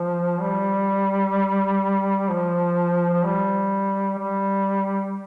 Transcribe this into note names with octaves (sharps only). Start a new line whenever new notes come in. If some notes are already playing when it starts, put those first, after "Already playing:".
Already playing: F3
G3
F3
F3
G3
G3